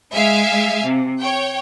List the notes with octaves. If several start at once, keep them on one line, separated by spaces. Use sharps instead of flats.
G#3 E5 F5 G#5
C3
C#5 G5